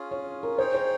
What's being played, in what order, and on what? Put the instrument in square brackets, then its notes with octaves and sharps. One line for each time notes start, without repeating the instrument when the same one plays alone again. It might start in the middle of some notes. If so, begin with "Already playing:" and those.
Already playing: [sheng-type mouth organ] C#4 F4 G#4
[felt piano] C#5
A#4
[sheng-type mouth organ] D#4 G#4 C#5 G5 [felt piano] C5
[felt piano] C5